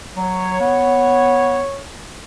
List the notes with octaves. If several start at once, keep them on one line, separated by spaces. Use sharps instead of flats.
F#3 C#5
B3